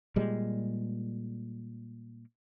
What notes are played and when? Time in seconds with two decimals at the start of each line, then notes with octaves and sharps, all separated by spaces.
0.16 A#2 G3 G#3